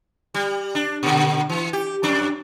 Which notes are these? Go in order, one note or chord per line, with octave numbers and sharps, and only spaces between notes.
G3
D4
A#2 D3
E3
G4
F2 D4